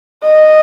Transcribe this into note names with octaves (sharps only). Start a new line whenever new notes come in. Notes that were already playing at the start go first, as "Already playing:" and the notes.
D#5